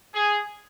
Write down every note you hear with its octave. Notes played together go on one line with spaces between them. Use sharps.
G#4